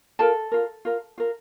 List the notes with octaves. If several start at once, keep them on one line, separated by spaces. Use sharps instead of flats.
F4 A4 A#4 A5
F4 A#4
F4 A#4
F4 A#4